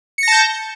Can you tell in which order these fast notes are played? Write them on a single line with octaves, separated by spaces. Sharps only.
C#7 A#6 A5 G6